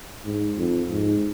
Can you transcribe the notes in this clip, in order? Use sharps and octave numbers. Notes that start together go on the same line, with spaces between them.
G#2
F2
G#2